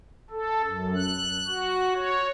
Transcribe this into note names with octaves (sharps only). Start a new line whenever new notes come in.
A4
F#2
F#6
F#4
C#5